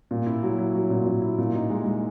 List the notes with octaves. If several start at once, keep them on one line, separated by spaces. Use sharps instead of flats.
A#2
E4
F#3
E4
F#3
A#2
A#2
E4
A#2
D#4
G#3
G#3